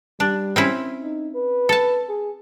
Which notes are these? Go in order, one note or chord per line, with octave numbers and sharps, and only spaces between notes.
G3 D4
C4 C#4 E4
D#4
B4
A4 A5
G#4